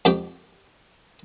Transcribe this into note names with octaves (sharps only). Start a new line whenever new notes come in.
F2 G4 G5